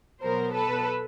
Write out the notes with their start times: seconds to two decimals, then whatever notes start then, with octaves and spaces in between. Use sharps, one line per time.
0.21 B2 F#3 B3 A#4 C5
0.53 A4 B4